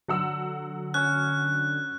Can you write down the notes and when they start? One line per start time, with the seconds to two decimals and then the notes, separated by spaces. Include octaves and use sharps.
0.08 D3 F#3 F#5 E6
0.94 C#4 F#6